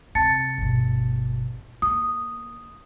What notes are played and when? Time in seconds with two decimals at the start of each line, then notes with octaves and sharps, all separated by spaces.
0.15 C3 A5 A6 C#7
0.58 G1 B2
1.82 A#3 D#6